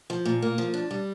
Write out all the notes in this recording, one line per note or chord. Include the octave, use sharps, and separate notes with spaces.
F3
A#2
A#3
F3
D4
G3